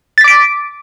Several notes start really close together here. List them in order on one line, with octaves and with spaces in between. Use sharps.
A6 B6 D6 D7